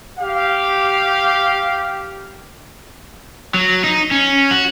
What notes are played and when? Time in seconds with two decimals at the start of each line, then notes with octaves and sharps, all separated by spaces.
0.20 G4 F5
3.54 F#3
3.84 D#4
4.11 C#4
4.51 F#4